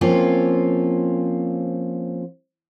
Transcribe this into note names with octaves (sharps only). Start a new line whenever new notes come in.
F3 A#3 C4 C#4 F4